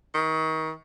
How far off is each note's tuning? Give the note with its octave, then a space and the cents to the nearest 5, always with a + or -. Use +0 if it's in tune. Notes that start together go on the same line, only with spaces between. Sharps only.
D#3 +30